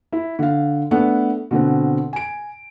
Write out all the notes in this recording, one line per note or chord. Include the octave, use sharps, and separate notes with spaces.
E4
D3 F5
A3 B3 D4
B2 D3 C4
G#5 D7